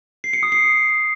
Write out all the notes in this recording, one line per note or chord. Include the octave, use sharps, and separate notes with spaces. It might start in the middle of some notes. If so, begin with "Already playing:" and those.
C7
C#7
D#6
C7